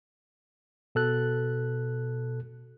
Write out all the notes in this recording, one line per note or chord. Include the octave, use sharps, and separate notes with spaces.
B2 A4 F#6